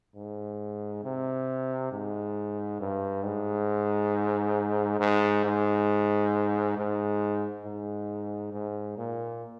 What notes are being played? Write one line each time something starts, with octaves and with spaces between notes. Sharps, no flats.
G#2
C3
G#2
G2
G#2
G#2
G#2
G#2
G#2
G#2
A#2